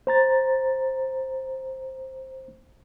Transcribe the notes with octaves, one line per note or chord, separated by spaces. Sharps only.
C5 A#5 A6